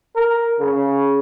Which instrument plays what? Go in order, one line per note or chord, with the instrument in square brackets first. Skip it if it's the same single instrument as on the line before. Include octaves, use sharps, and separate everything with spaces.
[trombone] A#4
C#3